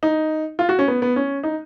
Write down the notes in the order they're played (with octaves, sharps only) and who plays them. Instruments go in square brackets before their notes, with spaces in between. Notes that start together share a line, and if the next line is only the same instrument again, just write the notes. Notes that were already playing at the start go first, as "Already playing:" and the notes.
[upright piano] D#4
F4
F#4
C#4
B3
B3
C#4
D#4